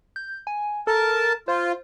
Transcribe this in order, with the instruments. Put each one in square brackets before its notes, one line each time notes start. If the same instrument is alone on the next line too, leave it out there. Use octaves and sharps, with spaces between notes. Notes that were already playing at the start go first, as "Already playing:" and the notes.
[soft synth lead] G6
G#5
[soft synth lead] A4 [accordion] A#4 A5
[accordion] F4 [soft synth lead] C5